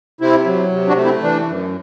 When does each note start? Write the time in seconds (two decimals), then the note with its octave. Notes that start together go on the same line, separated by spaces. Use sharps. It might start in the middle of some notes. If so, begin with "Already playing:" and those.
0.21 C3 C4 E4
0.46 F#3
0.72 C3
0.88 D4 F#4
0.97 A3
1.05 C4 E4
1.22 E3 D4
1.47 F#2